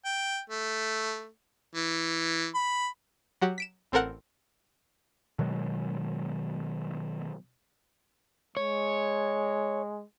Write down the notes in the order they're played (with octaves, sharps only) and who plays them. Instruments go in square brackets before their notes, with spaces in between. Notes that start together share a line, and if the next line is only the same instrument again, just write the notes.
[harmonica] G5
A3
E3
B5
[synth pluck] F#3 F#4 G4
B6 D7 E7
A1 C4 A4 A#4 F#5 F#6
[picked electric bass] B2 D#3 F#3 G#3
[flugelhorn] G#3 [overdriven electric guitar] C#5